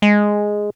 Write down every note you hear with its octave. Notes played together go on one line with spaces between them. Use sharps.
G#3